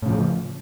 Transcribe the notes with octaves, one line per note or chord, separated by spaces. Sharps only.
A2 C#3 F3